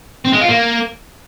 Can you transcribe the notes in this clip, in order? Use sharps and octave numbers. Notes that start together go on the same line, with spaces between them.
C4
G#3
F4
A#3